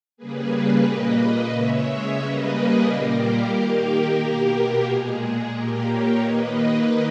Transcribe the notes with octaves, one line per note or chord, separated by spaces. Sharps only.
C#3 G3 A#3 G#4 B4
G#4 B4
A#2 A#3 B4 D#5
C#3 G#3 C#5 E5
C#3 G3 A#3 B4 D#5
G#4 B4
A#2 G3 A#3 G4 A#4
D#3 A#3
B2 A#3
A#2 G#3 G#4
A#2 A#3 G4 A#4
A#4 C#5
D#3 A#3 B4 D#5